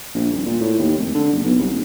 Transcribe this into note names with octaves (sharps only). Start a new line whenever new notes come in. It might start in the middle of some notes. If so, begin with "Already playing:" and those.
A#1
D#1
A#2
A2
D#2
F1
D3
F#1
B1
C2
D#1